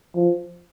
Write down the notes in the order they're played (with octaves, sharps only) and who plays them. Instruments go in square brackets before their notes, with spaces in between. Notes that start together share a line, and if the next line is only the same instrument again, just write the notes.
[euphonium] F3